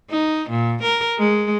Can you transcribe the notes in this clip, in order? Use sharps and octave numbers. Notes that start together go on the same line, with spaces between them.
D#4
A#2
A#4
G#3